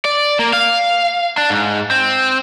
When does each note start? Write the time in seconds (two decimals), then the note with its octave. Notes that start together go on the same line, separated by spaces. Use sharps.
0.05 D5
0.39 A#3
0.53 F5
1.38 D4
1.50 G#2
1.91 C4